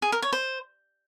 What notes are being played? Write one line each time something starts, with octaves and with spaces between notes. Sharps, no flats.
G#4
A#4
C#5
C5